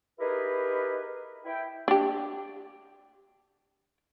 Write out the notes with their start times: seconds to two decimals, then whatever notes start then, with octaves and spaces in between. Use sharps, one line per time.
0.19 D#4 E4 G4 G#4 A#4 B4
1.45 E4 G5
1.88 D4 G4